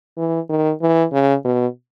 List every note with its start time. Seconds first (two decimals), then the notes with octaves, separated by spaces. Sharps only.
0.18 E3
0.50 D#3
0.82 E3
1.13 C#3
1.45 B2